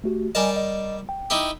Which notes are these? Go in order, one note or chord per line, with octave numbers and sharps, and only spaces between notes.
A3 F#4 G4
G3 A#4 D#5 G#5 A5
D#5
G5
D#4 E4 G4